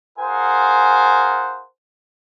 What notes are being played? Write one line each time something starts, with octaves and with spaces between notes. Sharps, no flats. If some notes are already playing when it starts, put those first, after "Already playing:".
F4 G#4 A#4 C5 F#5 G#5